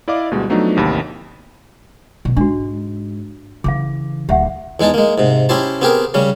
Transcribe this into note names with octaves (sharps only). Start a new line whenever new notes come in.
E4 D5 D#5 F5 D6
D2 B2 G3 G#3
F3 F#3 A3 B3 D4 D#4
A1 D#2 C3 B5
B2
G#2 D4 F#4
C#3 E3 F5 D6
D1 G4 E5 F#5
E2 G#3 D#4 G#4 A5
G#3 A#3
G#2 C3
C#4 E4 G4 C5 A5
B3 C4 G4 G#4 A#4
C#3 G3 C#4